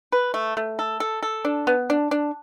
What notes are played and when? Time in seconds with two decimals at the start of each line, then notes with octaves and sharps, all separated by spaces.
0.12 B4
0.34 A3
0.57 A3
0.79 A4
1.00 A4
1.23 A4
1.45 D4
1.67 B3
1.90 D4
2.11 D4